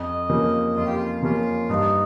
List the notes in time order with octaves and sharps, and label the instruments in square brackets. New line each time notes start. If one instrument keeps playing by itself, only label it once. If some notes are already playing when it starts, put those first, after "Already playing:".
Already playing: [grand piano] F2 [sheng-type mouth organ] D#5
[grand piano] C#3 F3 A#3 C#4
[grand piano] F2 [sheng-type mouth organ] F4
[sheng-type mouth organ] G4
F4
[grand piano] C#3 F3 A#3 C#4 [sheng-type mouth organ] F4
[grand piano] G2 [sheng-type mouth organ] D#4